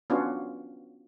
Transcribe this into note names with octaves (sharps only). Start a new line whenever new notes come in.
B3 C#4 D4 F4 F#4